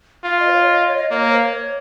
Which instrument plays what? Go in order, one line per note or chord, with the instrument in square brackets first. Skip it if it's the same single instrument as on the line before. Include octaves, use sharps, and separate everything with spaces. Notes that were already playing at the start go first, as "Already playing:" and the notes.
[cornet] F4 [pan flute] F5
[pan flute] D#5
C5
C#5
D#5
C#5
D#5
[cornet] A#3 [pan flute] C#5
[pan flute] C#5
C5
C#5